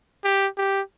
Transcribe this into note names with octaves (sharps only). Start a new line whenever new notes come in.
G4
G4